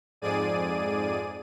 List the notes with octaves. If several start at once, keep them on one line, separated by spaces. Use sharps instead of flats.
F2 G#2 G#4 D5 D#7